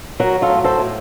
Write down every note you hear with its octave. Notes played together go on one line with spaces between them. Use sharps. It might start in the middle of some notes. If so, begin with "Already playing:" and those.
F#3 F#4 A#4
F4 A4
A2
A4 C5
A2